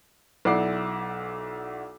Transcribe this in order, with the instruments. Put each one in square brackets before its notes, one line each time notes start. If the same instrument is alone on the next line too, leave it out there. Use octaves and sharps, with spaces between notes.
[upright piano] B1 E4 D5 F#5 D6 C7